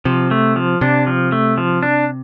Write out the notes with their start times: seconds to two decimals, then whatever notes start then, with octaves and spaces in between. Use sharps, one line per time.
0.05 C3 F3
0.31 A3
0.56 F3
0.81 C3 D4
1.07 F3
1.32 A3
1.58 F3
1.83 D4